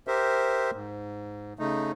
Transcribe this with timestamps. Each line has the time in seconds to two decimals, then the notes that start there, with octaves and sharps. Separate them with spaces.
0.07 G4 A#4 C5 E5
0.74 G#2
1.59 C#3 A3 D#4